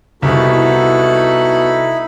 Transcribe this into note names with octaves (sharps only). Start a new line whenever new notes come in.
C2 B3 D#4 E4 F#4 A4 B5